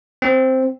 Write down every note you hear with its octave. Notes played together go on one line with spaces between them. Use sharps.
C4